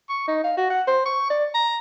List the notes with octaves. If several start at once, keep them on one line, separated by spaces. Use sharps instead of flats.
C#6
D#4
F5
F#4
F#5
C5
C#6
D5
A#5